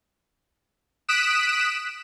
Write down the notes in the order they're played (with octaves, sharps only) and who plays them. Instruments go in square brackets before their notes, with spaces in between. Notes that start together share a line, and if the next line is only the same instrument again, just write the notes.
[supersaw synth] D#6 F#6 B6 D7 E7